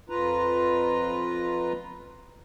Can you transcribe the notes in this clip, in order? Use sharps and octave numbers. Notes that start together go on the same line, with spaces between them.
F2 F4 B4 A#5